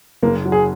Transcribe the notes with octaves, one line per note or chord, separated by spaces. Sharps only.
F#1 A#3
F#3
G#4